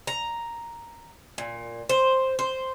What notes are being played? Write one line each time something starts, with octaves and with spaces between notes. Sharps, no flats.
A#5
A#2
C5
C5